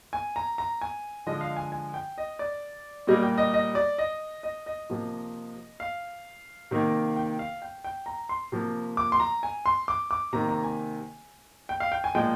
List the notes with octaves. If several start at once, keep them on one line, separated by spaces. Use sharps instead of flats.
G#5
A#5
A#5
G#5
D3 F3 G#3 D#5
F5
G#5
G#5
G5
D#5
D5
A#2 G3 A#3 D#5
G5
D#5
D#5
D5
D#5
D#5
D#5
C3 F3 A#3
F5
C3 D#3 A#3
G5
F5
G5
G5
A#5
C6
C3 F3 A#3
D6
C6
A#5
G#5
C6
D6
D6
C3 D#3 A#3 A#5
A#5
G#5
G5
F5
G5
G#5
A#2 F3 G#3 G5